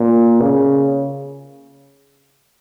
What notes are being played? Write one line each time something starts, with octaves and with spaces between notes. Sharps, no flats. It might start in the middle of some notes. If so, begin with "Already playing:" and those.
Already playing: A#2
C#3